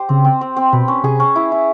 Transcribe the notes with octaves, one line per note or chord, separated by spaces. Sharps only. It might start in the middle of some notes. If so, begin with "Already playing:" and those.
Already playing: G4 C5
C#3 C4
C4
C4
C4
B2 B4
C#4
C3 G#4
C#4
E4
E4